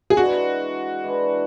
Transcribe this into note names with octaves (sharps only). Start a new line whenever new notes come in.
G#4
E3 G#3 D4 F#4
E3 G#3 D4